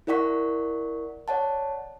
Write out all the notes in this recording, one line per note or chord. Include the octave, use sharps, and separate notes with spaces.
E4 A#4 D5 F#5 C#6 B6
C#5 D5 F#5 A5